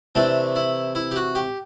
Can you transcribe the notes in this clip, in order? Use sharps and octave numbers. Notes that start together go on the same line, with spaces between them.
C3 E3 A3 D4
E4
E4
G4
F#4
G4